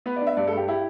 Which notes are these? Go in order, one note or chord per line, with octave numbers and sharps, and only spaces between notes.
B3 B4
D5
D4
E5
G2 D5
A4
G2 G4
E4 G4